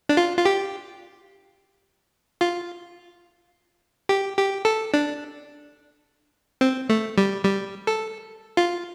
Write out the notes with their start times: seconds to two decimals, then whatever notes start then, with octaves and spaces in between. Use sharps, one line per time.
0.09 D4
0.17 F4
0.37 F4
0.45 G4
2.41 F4
4.09 G4
4.37 G4
4.65 A4
4.94 D4
6.61 C4
6.89 A3
7.18 G3
7.45 G3
7.87 A4
8.57 F4